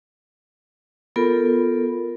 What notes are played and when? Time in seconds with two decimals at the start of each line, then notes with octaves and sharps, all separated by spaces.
1.16 B3 F4 A4 A#4